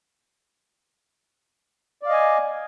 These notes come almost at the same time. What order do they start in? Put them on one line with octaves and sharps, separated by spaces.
D5 F5 D#5 G#5